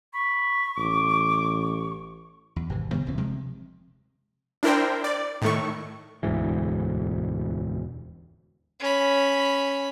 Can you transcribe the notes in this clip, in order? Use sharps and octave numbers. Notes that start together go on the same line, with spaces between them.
B5 C#6
A1 D6
E2
G#1 C3 E3
C3 D#3 G3 B3
F#1 D#2 E3 C4
C3 F3 G#3
D4 E4 A#4 C5 G5
D5
A2 D#3 A3 C#6
E1 D2 G#2 E3
C#4 B5